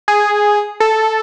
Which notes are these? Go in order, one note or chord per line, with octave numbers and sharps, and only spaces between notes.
G#4
A4